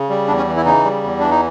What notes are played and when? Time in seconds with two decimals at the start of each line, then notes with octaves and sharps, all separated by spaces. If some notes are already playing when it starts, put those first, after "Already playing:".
Already playing: C#3
0.10 G3
0.28 E2 D4
0.37 C#4
0.47 E3
0.57 E4
0.65 C#3 D#4
0.84 G3
1.04 E2
1.19 E3 D4
1.31 D#4